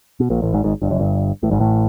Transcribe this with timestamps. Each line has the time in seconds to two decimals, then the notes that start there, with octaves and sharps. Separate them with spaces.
0.20 B2
0.30 A#1 A#2
0.42 A1 A2
0.53 G#1 G#2
0.64 G#1 G#2
0.82 G1 G2
0.91 F#1 F#2
0.99 G1 G2
1.43 A1 A2
1.51 G#1 G#2
1.60 A1 A2